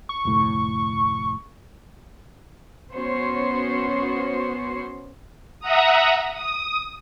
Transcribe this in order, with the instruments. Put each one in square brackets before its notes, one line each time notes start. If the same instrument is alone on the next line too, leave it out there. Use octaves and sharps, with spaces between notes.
[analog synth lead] C#6
[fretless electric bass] F1 D2 A2
[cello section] B3 C#4 F#4 C5 C#5
[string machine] E5 F#5 A#5 D#6
D#6